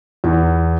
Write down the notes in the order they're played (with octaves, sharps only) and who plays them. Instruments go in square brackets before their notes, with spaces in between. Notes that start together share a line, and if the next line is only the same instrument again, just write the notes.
[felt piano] E2